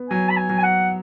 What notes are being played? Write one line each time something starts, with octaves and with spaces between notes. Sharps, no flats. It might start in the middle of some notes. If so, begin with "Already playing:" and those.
Already playing: B3
F#3 G#5
B5
G#5
F#3
G#5
F#5